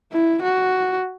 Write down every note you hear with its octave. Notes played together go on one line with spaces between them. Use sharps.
E4
F#4